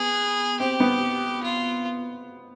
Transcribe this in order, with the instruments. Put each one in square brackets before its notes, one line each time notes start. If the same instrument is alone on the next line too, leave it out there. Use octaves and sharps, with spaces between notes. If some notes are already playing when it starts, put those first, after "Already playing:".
Already playing: [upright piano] B3 [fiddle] G#4
[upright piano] C4 [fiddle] G4
[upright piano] B3
[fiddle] F4